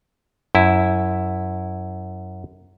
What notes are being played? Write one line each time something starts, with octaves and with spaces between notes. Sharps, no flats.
F#2 E4